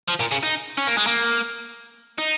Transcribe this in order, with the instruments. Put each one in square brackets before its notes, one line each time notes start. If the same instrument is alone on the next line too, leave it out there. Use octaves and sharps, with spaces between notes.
[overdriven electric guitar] F3
A#2
C#3
D#4
C#4
A#3
G#3
A#3
D#4